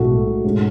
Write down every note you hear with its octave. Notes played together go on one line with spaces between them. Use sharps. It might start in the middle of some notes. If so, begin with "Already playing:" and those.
Already playing: B1 A2 G#3 F#4 A4
G#2 G#3 C#4